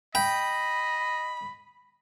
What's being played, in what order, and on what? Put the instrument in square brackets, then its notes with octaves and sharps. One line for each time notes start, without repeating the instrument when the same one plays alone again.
[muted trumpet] D#5 [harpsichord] G5 [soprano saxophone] B5